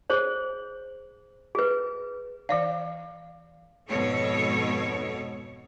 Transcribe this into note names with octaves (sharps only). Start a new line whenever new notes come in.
G#4 C5 C#5
G#4 B4
E3 C5 D5 F5
F2 G#2 B2 A4 C#5